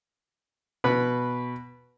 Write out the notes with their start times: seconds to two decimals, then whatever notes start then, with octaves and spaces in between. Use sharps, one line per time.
0.84 B2 B4 B5